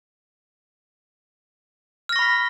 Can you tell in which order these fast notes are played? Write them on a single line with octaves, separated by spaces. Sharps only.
F6 A#6 C#6 B5 B6